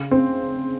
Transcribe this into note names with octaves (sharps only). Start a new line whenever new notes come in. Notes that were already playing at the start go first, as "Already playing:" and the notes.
Already playing: C#3
C4